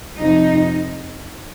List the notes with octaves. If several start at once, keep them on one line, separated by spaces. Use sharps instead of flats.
F2 C3 F3 D#4